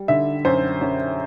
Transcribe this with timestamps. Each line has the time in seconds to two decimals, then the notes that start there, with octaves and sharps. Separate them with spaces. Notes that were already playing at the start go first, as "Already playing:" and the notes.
Already playing: G3
0.08 D3 E5
0.45 F#2 C5
0.81 F#2